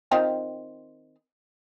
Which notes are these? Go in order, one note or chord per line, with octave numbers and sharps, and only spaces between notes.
D#3 C4 F4